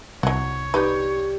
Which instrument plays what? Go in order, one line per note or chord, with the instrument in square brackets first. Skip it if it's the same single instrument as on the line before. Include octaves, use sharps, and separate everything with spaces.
[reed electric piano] C2 [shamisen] F#3 F#4 [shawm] C#5
[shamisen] D#4 B4 [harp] G4 D5